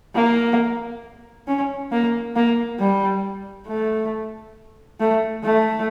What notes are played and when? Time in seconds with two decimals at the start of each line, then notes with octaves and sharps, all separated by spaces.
0.15 A#3
1.47 C#4
1.92 A#3
2.36 A#3
2.79 G3
3.68 A3
5.00 A3
5.44 A3